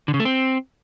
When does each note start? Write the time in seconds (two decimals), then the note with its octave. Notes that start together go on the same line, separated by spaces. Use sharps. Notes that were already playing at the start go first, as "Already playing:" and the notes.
0.08 D3
0.14 C#3
0.20 A3
0.25 C4